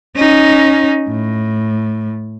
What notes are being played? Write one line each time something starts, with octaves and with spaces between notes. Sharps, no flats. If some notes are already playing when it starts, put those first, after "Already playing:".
C#4 D#4
A2